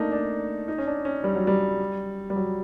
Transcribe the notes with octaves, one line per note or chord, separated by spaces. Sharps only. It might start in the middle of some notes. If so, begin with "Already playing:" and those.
Already playing: A3 A#3 D4 D#4
D4
D#4
C#4
D4
C#4
G3
F#3
G3
G3
F#3